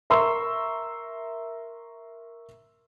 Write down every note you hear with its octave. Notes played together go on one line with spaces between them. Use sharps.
A#4 E5 A#5 C6 C#6 E6